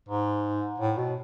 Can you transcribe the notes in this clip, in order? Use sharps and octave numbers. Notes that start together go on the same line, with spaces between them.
G#2
A2
B2